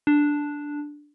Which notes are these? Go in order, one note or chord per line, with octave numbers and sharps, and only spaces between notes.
D4